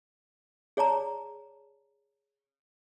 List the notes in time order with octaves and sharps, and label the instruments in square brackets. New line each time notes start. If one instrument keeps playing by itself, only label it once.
[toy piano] G#4 C#5 D5 A5 A#5